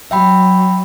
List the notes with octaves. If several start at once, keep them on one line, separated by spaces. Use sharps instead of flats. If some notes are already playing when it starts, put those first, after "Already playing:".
F#3 E5 G5 B5